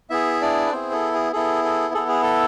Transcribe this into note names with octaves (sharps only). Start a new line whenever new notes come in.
B3 E4 G#4 E5
D4 D5
B4
B3 C4 E4 G#4 C5
A4
G#4
B3 E4 G#4 A4
A4
B3 E4 G#4 A4
G#4
A4